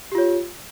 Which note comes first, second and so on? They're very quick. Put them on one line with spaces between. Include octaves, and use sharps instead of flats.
G4 F4 C#5